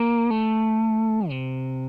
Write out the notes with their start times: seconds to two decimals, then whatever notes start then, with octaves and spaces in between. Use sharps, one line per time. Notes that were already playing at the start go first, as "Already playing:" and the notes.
Already playing: A#3
0.31 A3
1.29 C3